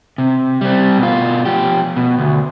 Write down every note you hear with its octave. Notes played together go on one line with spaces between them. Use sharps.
C3
G3 C4
B2 F4
F3 G4
B2
D2